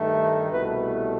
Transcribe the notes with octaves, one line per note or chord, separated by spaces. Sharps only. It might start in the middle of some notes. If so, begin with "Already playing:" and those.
Already playing: G2 D#3 A3
C2 B2 A3 B4